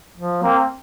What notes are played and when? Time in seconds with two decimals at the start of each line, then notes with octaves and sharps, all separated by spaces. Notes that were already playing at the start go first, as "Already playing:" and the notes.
0.17 F3
0.43 A#3 C4